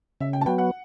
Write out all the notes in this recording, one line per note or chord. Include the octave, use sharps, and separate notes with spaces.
C#3 E5
G5
A5
F#3 B3 G5
F#5